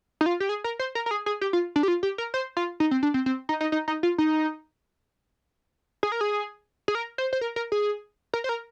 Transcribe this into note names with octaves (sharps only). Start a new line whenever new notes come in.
D#4
F4
G4
G#4
A#4
C5
A#4
A#4
G#4
G#4
G4
F4
D4
G4
F4
G4
A#4
C5
F4
D#4
C4
D4
C4
C4
D#4
D#4
D#4
D#4
F4
D#4
G#4
A#4
G#4
G#4
A#4
C5
C5
A#4
A#4
G#4
A#4
C5
A#4